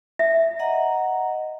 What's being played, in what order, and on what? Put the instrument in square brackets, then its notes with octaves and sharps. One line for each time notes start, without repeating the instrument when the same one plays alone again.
[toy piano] E5
[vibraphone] D#5 F#5 A#5